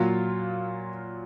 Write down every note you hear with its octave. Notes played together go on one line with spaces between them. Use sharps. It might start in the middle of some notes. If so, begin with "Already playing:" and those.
Already playing: A#2 F#3 F4